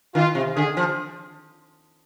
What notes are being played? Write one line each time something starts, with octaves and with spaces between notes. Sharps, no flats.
D#3 F4
C3
D3 G#4
F3